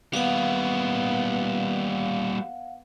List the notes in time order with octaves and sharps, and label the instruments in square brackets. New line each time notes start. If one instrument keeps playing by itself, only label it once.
[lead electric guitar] G3 A#3 [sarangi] B3 [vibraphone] F5 F#5